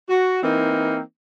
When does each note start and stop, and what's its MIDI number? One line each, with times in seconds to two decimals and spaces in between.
0.09 0.43 66
0.43 1.00 52
0.43 1.00 58
0.43 1.00 60
0.43 1.00 63